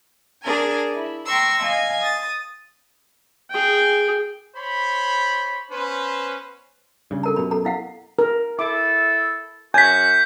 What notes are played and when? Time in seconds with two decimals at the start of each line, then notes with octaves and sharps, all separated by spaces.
0.43 D4 G#4 A#4 G#5
0.94 E4
1.26 G5 A#5 C6 C#6 E6
1.62 D#5 F5 G#5
2.02 D#6 A6
3.51 G#4 G5
4.56 C5 C#5 B5
5.70 B3 C#4 B4 C5
7.11 G2 C#3
7.23 A4 A#4 A#5
7.36 F#2 B2 G4 B5
7.51 A4 A#5
7.65 E4 F5 F#5
8.19 A#4
8.59 E4 A4 D6
9.74 F#2 F#4 G#5 G6 B6